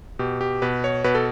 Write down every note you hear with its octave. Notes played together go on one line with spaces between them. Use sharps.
B2 G4
G4
B2 B4
C#5
B2 B4
A4